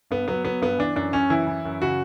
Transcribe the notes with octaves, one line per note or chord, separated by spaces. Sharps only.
G2 B3
F#3 B3
F#3 B3
G2 B3
E3 D4
F#2 D4
F#2 C#4
E3 E4
E3
F#2
C#3 F#4